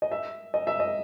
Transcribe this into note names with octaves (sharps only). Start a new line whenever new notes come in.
D#5
E5
D#5
E5
D#5